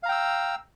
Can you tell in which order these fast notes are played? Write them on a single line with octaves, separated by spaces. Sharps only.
F5 A#5 G5 E6